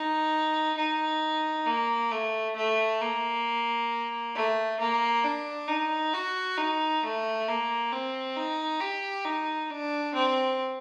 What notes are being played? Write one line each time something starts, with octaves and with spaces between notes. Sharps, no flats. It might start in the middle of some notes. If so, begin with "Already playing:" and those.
Already playing: D#4
D#4
A#3
A3
A3
A#3
A3
A#3
D4
D#4
F#4
D#4
A3
A#3
C4
D#4
G4
D#4
D4
C4